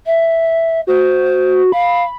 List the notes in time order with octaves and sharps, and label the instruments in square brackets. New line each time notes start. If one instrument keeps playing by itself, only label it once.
[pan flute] E5
[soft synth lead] F#4 [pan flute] C5
[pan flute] F5 [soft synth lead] B5